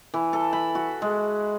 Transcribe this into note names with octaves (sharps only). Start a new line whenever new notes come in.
E3
A4
B5
F#4
G#3